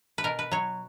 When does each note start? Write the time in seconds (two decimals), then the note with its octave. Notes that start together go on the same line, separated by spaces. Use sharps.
0.18 B4
0.24 B2 A#4
0.39 B4
0.52 F#3 C#5